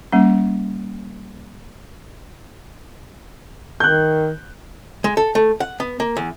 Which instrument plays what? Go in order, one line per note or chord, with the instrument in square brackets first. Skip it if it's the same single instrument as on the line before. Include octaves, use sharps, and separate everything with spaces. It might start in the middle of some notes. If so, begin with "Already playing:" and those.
[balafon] G3 A#3 C#4
[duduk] D#3 [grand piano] F#6 G6
[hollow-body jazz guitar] G#3
A4
A3
F#5
B3
A#3
E2